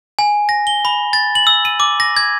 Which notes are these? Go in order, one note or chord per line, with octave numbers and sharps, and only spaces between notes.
G#5
A#6
G7
B5
A6
F#7
E6
D#7
D6
A#6
G#6